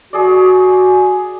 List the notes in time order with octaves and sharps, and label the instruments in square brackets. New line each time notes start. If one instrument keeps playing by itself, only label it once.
[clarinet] F#4 [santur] G#4 D5